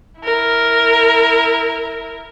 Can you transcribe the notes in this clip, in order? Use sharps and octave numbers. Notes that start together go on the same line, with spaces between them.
E4 A#4